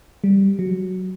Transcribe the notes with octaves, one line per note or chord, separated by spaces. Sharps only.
G3
F#3